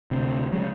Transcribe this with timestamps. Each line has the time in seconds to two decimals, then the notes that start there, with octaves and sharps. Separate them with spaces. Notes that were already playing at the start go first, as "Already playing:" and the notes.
0.11 D2 C3
0.53 C#3 F#3 G#3